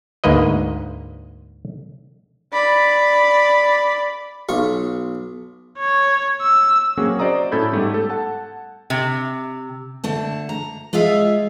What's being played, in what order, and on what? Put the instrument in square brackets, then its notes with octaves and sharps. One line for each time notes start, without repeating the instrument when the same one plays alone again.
[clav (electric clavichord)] D2 G#2 A#3 B4 D#5
[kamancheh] D5 B5
[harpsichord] B1 F4 C#6
[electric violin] C#5
E6
[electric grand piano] F#3 A#3 C4 C#4 F#4 G#4
F#4 C5 D5 D#5 A#5 D#6
A2 C#4 A4 B5 G6 G#6
G#2 G3 A3 B3 G4
A4
F#5 A5
[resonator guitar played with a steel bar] C3
[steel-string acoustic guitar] D3 A3 A5
A#5
G#3 F4 G#4 E5 F5